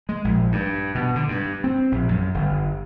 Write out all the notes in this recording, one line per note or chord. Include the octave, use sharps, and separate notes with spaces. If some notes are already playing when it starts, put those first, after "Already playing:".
G#3
A#1
G2
B2
D3
G2
C4
A#1
F#2
G1